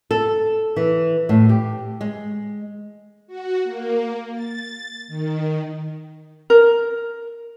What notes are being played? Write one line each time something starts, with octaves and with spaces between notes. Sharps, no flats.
A4
E3
A2
G4
G#3
F#4
A#3
A6
D#3
A#4